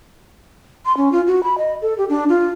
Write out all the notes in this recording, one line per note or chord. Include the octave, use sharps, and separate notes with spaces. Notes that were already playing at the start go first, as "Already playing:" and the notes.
C6
C#4
F4
F#4
B5
D#5
A4
G4
D4
F4